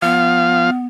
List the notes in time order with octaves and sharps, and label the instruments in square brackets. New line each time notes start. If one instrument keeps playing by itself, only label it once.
[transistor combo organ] F3 F5 [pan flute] B3